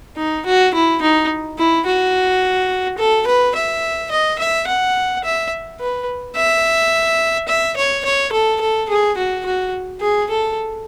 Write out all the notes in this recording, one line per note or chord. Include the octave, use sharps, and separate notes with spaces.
D#4
F#4
E4
D#4
E4
F#4
A4
B4
E5
D#5
E5
F#5
E5
B4
E5
E5
C#5
C#5
A4
A4
G#4
F#4
F#4
G#4
A4